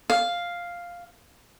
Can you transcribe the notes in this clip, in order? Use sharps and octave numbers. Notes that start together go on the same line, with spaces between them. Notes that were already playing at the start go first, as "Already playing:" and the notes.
F5